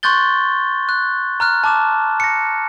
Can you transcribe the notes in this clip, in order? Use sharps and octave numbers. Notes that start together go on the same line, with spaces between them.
C6 C#6 F#6 G6 A6 G7
F#6
A#5 F6 F#6
A5 D6 E7
A#6 C#7